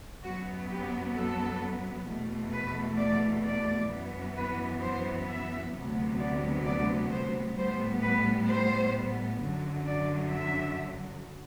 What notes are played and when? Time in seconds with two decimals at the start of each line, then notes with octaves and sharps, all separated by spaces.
0.22 F#2 F#3 B3 F#4
0.69 G4
1.14 A4
2.06 E2 B2 A3
2.52 B4
2.97 D5
3.44 D5
3.89 F#2 E3 B3
4.36 B4
4.81 C5
5.27 E5
5.74 D2 C3 F#3 B3
6.19 D5
6.65 D5
7.11 C5
7.57 A2 G3 B3 C5
8.02 B4
8.48 C5
9.41 F#2 D3 F#3
9.86 D5
10.32 E5